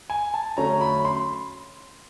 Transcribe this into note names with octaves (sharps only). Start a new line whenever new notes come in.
G#5
A5
D3 F#3 A3 C#4 A#5
A#5
B5
C6